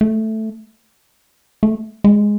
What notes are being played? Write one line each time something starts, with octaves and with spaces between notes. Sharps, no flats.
A3
A3
G#3